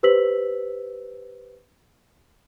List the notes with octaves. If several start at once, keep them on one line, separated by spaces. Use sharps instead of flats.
G4 B4 C5 E6 B6 F#7